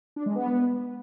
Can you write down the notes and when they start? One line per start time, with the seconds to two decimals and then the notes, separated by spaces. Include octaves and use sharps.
0.16 D4
0.26 G#3
0.35 B3